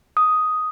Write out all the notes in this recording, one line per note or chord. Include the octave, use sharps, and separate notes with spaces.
D#6